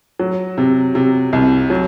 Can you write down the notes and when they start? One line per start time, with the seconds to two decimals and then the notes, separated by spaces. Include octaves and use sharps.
0.20 F#3
0.58 C3
0.95 C3
1.33 C2
1.70 F#3